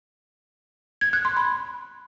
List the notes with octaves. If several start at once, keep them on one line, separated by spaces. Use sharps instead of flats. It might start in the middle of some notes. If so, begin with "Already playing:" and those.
G#6
F#6
C6
B5